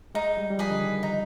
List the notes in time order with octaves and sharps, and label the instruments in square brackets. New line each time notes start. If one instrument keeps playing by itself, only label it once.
[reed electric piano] G#3 [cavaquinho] D#4
[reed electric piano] G3
G3
[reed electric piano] F3 [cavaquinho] G#4 B4 D#5
[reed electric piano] D3
D#3
[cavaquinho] D#4